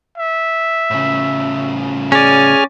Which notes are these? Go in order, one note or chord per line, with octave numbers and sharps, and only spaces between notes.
E5
A2 C#3
C#4 G#4 D5 G#5 F6